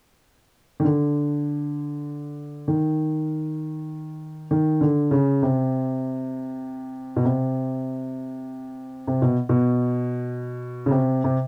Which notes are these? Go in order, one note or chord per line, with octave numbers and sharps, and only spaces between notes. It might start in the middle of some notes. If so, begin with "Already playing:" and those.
D#3
D3
D#3
D#3
D3
C#3
C3
B2
C3
C3
B2
B2
C#3
C3
C3